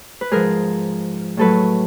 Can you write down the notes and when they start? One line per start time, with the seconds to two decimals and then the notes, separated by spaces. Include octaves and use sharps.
0.21 B4
0.31 G#2 F3 G#4 A#4
1.37 A2 F#3 A4 B4